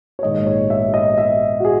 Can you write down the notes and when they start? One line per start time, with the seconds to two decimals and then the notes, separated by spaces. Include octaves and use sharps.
0.19 C#5
0.23 A#1 G#2 D#3 G#3 D#5
0.47 C#5
0.70 E5
0.94 D#5
1.18 E5
1.60 F#4
1.65 G#4